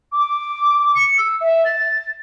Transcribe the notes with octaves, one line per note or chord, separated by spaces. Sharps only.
D6
C#7
E6
E5
A6